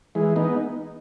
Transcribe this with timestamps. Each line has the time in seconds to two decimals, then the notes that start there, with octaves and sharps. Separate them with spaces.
0.15 E3 G#3
0.36 B3 D#4